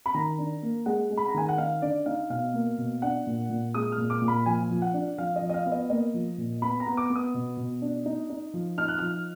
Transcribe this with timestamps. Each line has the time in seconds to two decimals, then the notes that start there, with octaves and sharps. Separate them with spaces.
0.06 B5
0.14 D#3 A#5
0.38 D4
0.62 A#3
0.86 G#3 F#5
1.10 G#3
1.17 B5
1.28 A#5
1.34 D#3 G#5
1.49 F#5
1.58 D#4 F5
1.82 D3 D5
2.06 D#4 F5
2.30 B2 F5
2.54 A#3
2.78 B2
3.02 D4 F#5
3.27 A#2
3.50 A#2
3.74 G#3 D#6
3.92 F6
3.98 A#2
4.10 D6
4.22 A#2
4.28 B5
4.46 F3 G#5
4.70 F3
4.82 F#5
4.94 D4
5.18 F3 F5
5.36 D#5
5.42 F3
5.49 D#5
5.54 F5
5.66 B3
5.72 D#5
5.90 A#3 D#5
6.14 F3
6.38 A#2
6.62 B3 B5
6.80 A#5
6.86 B3
6.97 D6
7.10 B3
7.16 D#6
7.34 B2
7.57 B2
7.82 D4
8.06 D#4
8.30 D#4
8.54 F3
8.78 D#4 F6
8.88 F#6
8.98 F3 F6